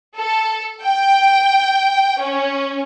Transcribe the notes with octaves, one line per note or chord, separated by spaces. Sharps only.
A4
G5
C#4